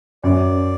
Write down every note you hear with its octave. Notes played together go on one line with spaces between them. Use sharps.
F#2 D5